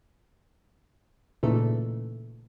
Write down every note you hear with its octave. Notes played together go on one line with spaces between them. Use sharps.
A#2 C#3 E3 A3 D#4 A4